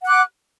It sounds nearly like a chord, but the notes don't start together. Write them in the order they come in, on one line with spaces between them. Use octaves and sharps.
F#5 F#6 D6